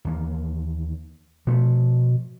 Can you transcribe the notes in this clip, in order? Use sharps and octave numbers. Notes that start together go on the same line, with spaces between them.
D#2 E3 A#3
B2 F3 A3